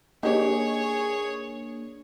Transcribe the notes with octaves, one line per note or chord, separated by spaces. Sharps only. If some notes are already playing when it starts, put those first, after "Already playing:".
A#3 D4 D#4 G4 G#4 C#5 D5